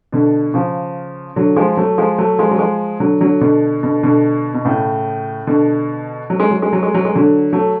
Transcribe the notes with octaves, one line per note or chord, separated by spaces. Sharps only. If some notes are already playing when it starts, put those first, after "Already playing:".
B2 D3
C#3 F3
D3 F#3
F3 G#3
F#3 A3
F3 G#3
F#3 A3
F3 G#3
F#3
F3 G#3
D3 F#3
D3 F#3
B2 D3
B2 D3
B2 D3
B2
A2 C#3
B2 D3
F#3
G#3
F#3
G#3
F#3
G#3
F#3
G#3
D3 F#3
F#3 A3